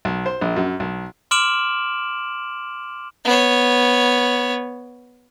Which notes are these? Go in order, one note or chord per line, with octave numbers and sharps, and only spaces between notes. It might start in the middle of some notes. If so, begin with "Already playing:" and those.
B1
C5
A#1
F#2
B1
C6 D6 F6 D7 E7 F#7
B3 C#5